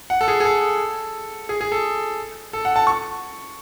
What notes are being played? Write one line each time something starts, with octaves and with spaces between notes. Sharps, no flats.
F#5
A4
G#4
G#4
A4
G#4
G#4
A4
A4
F#5
A5
C#6